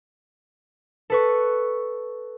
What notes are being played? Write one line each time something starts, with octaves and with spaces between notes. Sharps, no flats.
A4 B4 C#6